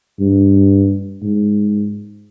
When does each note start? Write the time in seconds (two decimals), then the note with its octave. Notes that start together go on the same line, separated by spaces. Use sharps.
0.20 G2
1.22 G#2